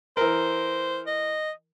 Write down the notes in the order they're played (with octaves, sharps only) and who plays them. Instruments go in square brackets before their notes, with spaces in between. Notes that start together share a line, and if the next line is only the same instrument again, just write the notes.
[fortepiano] E3 A#4 [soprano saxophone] C5
[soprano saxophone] D#5